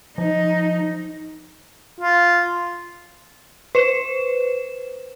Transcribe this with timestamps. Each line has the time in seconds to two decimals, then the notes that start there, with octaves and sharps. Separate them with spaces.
0.18 F3 D#4
2.00 F4
3.75 B4 C5 E7